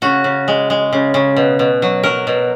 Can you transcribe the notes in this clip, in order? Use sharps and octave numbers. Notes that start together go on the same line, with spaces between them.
C#3 F#4
C#3
G#3
G#3
C#3
C#3
B2
B2
F#3
F#3 A#4
B2